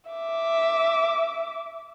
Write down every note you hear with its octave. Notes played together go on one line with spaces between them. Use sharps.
E5 D6